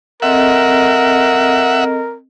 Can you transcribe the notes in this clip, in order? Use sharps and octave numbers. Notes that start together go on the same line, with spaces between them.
C4 A4 A#4 D#5 E5 F#5